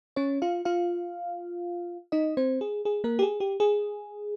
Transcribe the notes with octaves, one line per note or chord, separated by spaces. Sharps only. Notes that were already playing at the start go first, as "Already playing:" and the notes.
C#4 C#5
F4 F5
F4 F5
D#4 D#5
C4 C5
G#4
G#4
A#3 A#4
G4
G#4
G4
G#4